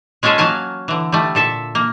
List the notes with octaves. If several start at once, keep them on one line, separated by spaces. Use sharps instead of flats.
G#3 C#4 F4 G#4 A4
F#3 A#3 F5 G#5 A5
D3 E3
G3 A3
A#2 A4 E5
A#3